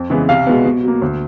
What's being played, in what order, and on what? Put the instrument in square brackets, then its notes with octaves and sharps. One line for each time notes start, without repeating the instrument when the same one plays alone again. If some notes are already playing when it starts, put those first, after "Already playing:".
Already playing: [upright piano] F2
C#3 E3 G#3 B3
C2 F5
B2 G#3 B3
B2
F#3
A#3
D2